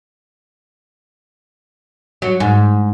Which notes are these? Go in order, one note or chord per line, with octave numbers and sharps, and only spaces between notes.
F#3
G#2